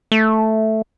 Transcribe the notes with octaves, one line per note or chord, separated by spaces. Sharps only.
A3